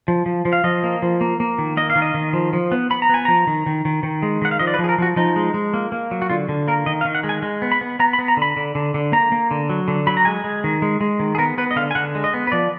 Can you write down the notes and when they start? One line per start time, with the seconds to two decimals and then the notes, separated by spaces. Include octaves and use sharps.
0.08 F3
0.26 F3
0.45 F3
0.53 F5
0.64 F3 D#5
0.84 A#3
1.02 F3
1.21 A#3
1.40 A#3
1.58 D#3
1.77 A#3 D#5
1.90 F5
1.96 D#3
2.02 D#5
2.14 D#3
2.33 F3
2.53 F3
2.72 B3
2.90 B3 B5
3.02 A#5
3.09 B3 G#5
3.25 F3 A#5
3.47 D#3
3.66 D#3
3.85 D#3
4.03 D#3
4.23 G#3
4.42 D#3 F#5
4.51 F5
4.59 F3 D#5
4.67 D5
4.74 B4
4.79 F3
4.84 G#4
4.89 A#4
4.98 F3 F#4
5.16 F3 D#4
5.36 G#3
5.54 G#3
5.74 A#3
5.92 A#3
6.11 F#3
6.22 F#4
6.30 D3 F4
6.49 D3
6.68 A#3 A#4
6.86 D#3 D#5
7.01 F5
7.05 D#3
7.15 F#5
7.23 G#3
7.29 G#5
7.42 G#3
7.62 B3
7.72 B5
7.81 B3
8.00 B3 A#5
8.13 B5
8.19 B3
8.28 A#5
8.37 D3 B5
8.56 D3
8.75 D3
8.94 D3
9.12 A#3 A#5
9.32 A#3
9.51 D3
9.70 F#3
9.88 D3
10.07 F#3 B5
10.17 A#5
10.25 G#3 G#5
10.44 G#3
10.64 D#3
10.82 G#3
11.01 G#3
11.20 D#3
11.35 G#4
11.38 B3 A#4
11.58 B3 B4
11.71 D#5
11.76 D3 F5
11.91 G#5
11.95 D3 F#5
12.15 G#3
12.24 D#5
12.34 B3
12.47 B4
12.52 F3 D5